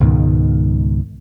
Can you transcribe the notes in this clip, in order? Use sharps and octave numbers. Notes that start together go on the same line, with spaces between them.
C#2 G#2 B2 D#3